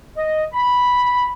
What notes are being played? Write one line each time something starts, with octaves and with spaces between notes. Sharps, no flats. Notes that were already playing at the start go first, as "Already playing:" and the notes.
D#5
B5